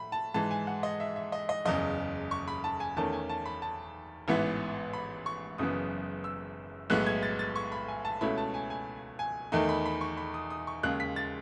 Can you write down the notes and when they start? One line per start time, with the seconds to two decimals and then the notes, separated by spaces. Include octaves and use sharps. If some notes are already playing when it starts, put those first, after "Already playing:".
Already playing: A2 B5
0.12 A5
0.34 G#2 E3 G#3 A5
0.51 G#5
0.67 F#5
0.83 D#5
1.00 E5
1.16 E5
1.32 D#5
1.49 D#5
1.65 F#1 E2 C#3 D#5
2.31 C#6
2.48 B5
2.64 A5
2.80 G#5
2.96 E2 D#3 A3 C#4 A5
3.13 G#5
3.29 A5
3.46 B5
3.62 A5
4.28 A1 G#2 E3 B3 E4
4.93 B5
5.26 C#6
5.58 F#1 F#2 C#3 E3 B3 D#6
6.24 E6
6.90 B1 A2 G#3 B3 E4 F#6
7.06 G#6
7.23 A6
7.39 A6
7.56 C#6
7.72 B5
7.88 G#5
8.05 A5
8.21 C#2 B2 A3 C#4 E4 B5
8.38 A5
8.54 G#5
8.70 G#5
9.19 G#5
9.52 E2 D#3 A3 D#4
9.69 B5
9.86 B5
10.01 C#6
10.17 B5
10.34 D#6
10.50 D#6
10.67 C#6
10.83 D#2 C#3 G#3 F#6
11.00 B6
11.16 A6